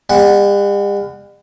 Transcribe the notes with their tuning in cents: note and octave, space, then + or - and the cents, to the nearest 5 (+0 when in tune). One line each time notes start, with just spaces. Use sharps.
G3 +45 F#5 +0